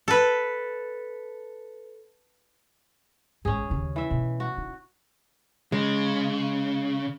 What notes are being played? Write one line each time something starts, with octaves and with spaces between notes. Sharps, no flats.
A4 B4
A1 G#2 C#4 G#4
D#2 C#3
E3 E5
B2
F#4
D#4
C#3 G#3